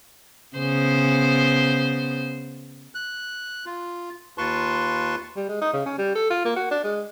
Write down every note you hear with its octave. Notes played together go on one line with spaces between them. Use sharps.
C#3 B3 C5
F#6
F4
D#2 F4 B4 A5 C6 C#6
G3
G#3
D#4
C#3
C#4
G3
A4
F4
A#3
F#4
D4
G#3